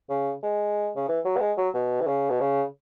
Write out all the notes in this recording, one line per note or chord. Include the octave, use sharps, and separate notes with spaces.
C#3
G#3
C#3
E3
F#3
B3
G#3
F#3
B2
E3
C#3
B2
C#3